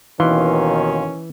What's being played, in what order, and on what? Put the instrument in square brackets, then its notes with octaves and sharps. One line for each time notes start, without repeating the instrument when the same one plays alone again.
[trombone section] D#2 B2 D#3 [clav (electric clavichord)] E3 [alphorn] C#4 [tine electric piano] F5 C6